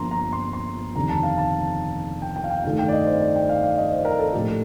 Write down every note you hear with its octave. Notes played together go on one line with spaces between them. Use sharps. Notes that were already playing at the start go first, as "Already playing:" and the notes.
Already playing: G1 G2 F3 A#3 A#5 C6
A#5
C6
C6
F1 D#2 D3 A#5
A5
F5
A5
G5
G5
F5
G5
G2 D#3 A3 F5
G5
D5
D#5
C5
D5
G5
F5
F5
D#5
C5
A#4
A4
A#1 A2 A3 G4